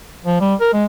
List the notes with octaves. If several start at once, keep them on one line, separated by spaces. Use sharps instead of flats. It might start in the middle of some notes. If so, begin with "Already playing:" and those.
F3
G3
A#4
G#3